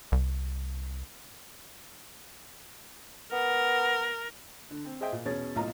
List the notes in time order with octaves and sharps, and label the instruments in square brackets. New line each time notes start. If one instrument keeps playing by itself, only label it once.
[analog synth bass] C2
[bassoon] B3 [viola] A#4
[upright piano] D3
C4
G#4 C5 D#5 E5 G5
A#2
E2 B2 C#4 G#4 C#5 A6
D#1 B1 A2 F4 D#5 A#5